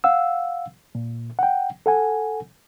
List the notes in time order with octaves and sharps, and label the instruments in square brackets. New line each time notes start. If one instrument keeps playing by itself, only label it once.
[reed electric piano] F5 F#5 E6
A#2
F#5 G5
A4 F#5 G#5